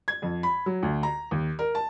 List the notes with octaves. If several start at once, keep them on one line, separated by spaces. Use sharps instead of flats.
G#6
F2
B5
F#3
D2
A#5
D#2
A#4
A5